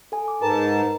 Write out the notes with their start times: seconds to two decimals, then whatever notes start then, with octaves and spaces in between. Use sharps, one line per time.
0.12 A4 G#5
0.28 D6
0.42 G#2 A#4 B4 A5 A#5